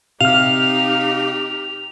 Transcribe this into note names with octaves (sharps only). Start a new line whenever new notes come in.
C3 D#4 G4 F5 F6 F7